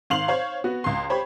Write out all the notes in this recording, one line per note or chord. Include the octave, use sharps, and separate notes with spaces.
G#1 F5 C6 F7 F#7
C5 C#5 F5
B3 F#4
C#2 C6
G4 C5 C#5 B5